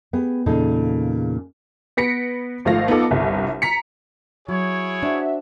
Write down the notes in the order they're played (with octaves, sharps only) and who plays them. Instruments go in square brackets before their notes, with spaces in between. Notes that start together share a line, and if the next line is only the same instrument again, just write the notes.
[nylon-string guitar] B3 G4 G#4
E2 A#2 C#3 D#4 G#4 A4
[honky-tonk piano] B3 B4 A#6 B6 C#7 D7
G#1 F3 A3 F5 A#6
B3 D#4 F4 A4 D6
G1 C2
A#5 B6 C#7
[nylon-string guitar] F#3 [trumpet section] E4 G#4 C#5
[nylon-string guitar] D4 [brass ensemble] F#4 C5 E5